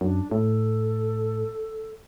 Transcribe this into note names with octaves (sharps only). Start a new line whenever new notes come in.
F#2 D4
A2 A4